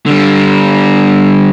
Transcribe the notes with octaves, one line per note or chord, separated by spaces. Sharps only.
D3 G3